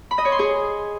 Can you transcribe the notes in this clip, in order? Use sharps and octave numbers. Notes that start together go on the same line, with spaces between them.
B5
D#5
C#5
C6
G#4